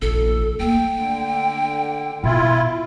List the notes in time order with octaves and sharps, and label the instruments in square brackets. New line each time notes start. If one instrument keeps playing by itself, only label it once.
[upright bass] F1 A#1 [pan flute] A4
[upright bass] A3 A#3 [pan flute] G5
[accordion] D3
[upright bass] B2 [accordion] E4 F4